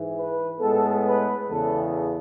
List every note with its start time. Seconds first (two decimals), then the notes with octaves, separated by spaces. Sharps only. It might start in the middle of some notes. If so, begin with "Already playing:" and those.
Already playing: G#2 E3 G#3
0.15 B4
0.60 A2 G#3 B3 A4
1.04 B4
1.49 E2 C#3 E3 B3 A4